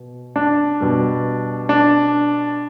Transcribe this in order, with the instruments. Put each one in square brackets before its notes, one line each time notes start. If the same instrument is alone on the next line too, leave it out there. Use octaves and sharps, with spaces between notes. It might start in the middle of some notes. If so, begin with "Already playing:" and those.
Already playing: [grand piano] B2
D4
B2 G3
D4